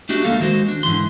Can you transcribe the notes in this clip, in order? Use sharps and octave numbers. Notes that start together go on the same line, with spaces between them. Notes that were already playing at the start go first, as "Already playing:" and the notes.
A3 D4 D#4 F#4 G4
D2 A3 A#3 A4 F5
D#3 G#3 F#4 C5
D4
G#2 D3 E3 C6